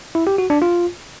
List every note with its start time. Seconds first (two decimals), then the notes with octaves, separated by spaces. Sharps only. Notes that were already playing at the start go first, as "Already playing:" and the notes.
0.15 E4
0.27 G4
0.38 F#4
0.50 D4
0.62 F4